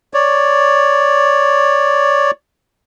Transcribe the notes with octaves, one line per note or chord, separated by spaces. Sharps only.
C#5 D5